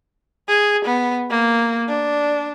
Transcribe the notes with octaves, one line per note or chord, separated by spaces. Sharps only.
G#4
B3
A#3
D4